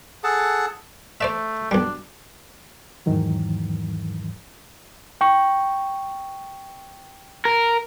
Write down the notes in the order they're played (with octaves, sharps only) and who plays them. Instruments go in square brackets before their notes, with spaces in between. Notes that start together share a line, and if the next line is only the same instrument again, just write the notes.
[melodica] G#4 A4 F#5 A5
[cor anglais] A3 [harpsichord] C5 D5 E5
[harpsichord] B1 G3 [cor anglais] D4
[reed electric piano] E2 G#2 D#3 E3 F#3
G5 C#6
[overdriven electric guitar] A#4